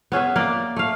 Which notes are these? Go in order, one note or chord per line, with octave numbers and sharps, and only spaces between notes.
B3 C#4 G#4 E5
A#3 D5
A3 F5